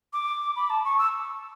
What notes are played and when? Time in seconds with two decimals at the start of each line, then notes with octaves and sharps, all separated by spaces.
0.13 D6
0.56 B5
0.70 A5
0.84 C#6
0.98 E6